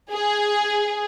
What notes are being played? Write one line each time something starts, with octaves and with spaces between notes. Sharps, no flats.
G#4